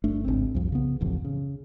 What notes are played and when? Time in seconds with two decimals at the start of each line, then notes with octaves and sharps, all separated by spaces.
0.04 G1 A3 D4
0.25 G#1 C#2 C4
0.55 C2 F2
0.72 C#3 B3
1.00 D1 A1 F2
1.25 C#3